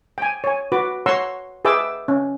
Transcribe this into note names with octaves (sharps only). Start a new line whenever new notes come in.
G5 G#5
C#5 G#5
F#4 B4 D6
C#5 F#5 A#5 C6 C#6 E6
G#4 B4 E5 G5 D6 E6
C#4